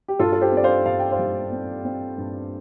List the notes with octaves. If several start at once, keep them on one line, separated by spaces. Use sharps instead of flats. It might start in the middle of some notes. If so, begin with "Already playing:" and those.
G4
G2 F4 A4
A4
G4 C5
C4
D5
C5 F5
G2 F5
G5
C5 F5
G3
C4
C4
G2